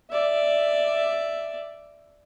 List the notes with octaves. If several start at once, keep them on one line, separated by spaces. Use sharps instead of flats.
D5 E5